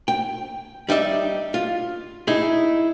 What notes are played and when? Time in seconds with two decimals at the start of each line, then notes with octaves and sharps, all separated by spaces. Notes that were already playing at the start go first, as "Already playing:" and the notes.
0.08 G5
0.89 G3 D#4 D5 E5
1.54 F4
2.27 D#4 E4 G#4